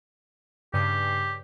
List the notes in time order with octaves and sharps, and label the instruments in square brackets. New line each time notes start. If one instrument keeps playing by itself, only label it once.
[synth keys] G2 C#3 C7 [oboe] G4